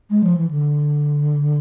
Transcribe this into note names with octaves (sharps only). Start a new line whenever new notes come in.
G#3
F3
E3
D3